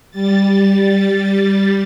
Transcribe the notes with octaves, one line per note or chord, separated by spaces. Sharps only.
G3 A6